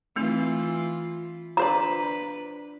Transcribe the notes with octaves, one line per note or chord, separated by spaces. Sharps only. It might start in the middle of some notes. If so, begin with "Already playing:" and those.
E3 A3 C4 D#4 F4
D4 F4 B4 C5 D5 A#5